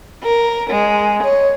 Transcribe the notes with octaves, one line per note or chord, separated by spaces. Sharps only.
A#4
G#3
C#5